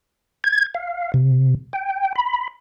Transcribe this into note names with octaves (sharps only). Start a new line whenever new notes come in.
G#6
F5
C3
G5
B5